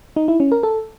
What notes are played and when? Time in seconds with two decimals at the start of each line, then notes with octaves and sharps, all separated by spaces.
0.16 D#4
0.28 E4
0.40 C#4
0.52 A#4
0.63 A4